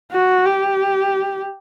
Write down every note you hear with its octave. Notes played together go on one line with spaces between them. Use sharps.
F#4
G4